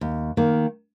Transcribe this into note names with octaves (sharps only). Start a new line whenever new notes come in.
D#2
D#3 A#3